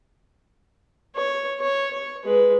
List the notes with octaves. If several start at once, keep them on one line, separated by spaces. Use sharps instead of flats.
C#5
C#5
C#5
G#3 B4